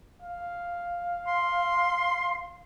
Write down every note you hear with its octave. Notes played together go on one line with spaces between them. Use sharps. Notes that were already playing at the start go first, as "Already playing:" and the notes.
F5
C6